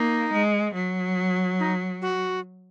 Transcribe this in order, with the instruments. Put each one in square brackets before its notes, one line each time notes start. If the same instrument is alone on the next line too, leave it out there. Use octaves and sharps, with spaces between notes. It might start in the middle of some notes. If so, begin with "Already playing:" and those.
Already playing: [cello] A#3 [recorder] D#4
[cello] G#3
F#3
[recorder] D#4
F#4